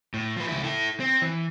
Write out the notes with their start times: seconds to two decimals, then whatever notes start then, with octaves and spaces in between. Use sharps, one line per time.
0.14 A2
0.36 F3 B4
0.49 C#2 E4
0.64 E4 A4
1.00 C4
1.22 E3